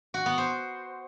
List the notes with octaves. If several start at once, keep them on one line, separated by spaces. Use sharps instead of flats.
F#4
B3
C5